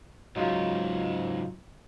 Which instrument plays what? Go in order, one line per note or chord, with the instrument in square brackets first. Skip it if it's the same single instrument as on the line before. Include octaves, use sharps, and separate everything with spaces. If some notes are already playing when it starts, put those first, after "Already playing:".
[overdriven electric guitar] G#2 C#3 [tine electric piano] F#3 D#4 F4